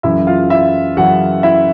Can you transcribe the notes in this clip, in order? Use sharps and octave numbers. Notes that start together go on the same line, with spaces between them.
F#2 C#3 E3 E4 E5
F4 F5
E4 E5
F#2 C#3 E3 F#4 F#5
E4 E5